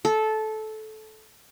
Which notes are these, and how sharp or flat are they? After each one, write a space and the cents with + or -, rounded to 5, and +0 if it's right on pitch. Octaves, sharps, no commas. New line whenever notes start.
A4 -15